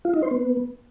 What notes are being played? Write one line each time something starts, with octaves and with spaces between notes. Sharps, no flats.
F4
D#4
C5
B3